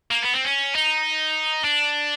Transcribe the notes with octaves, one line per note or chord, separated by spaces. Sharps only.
A#3
B3
C4
C#4
D#4
D4